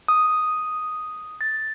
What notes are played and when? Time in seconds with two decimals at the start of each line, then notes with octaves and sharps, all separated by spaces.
0.08 D#6
1.41 A6